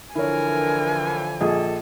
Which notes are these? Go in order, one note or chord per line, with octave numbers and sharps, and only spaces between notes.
D3 E3 F3 E4 A#4 C#5 G#5
A#1 G#4 A4 D#5